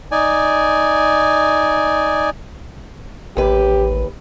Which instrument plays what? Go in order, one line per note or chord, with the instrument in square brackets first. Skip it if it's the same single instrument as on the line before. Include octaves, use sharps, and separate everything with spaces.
[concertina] D#4 D5 G#5
[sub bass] A1 [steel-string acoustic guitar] D#2 B4 [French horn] G4